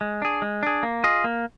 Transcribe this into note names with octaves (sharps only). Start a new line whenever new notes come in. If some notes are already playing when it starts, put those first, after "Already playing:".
G#3
D4 G#4
G#3
D4 G#4
A#3
F4 G#4 D#5
A#3